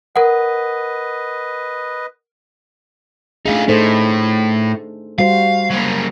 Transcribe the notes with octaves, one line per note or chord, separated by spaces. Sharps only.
A#4 B4 D#5 F#5
A3 D4 D#4 F4 G#4
A2 D#4 A4 C5
G3 F#4 C5 F5
F#3 A#3